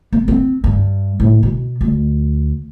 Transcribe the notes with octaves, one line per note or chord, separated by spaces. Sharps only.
B3
C4
G2
A2
B2
D2